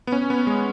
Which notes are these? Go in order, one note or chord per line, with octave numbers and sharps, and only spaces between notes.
B3
C#4
B3
G#3